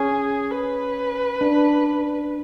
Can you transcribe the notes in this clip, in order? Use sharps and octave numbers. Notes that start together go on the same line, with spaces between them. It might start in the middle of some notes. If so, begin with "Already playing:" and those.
Already playing: C#4 G#4
B4
D4